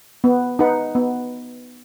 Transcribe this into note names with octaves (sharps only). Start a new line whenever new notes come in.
B3
D#4 B4 F#5
B3